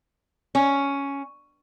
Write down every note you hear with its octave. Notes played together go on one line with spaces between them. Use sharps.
C#4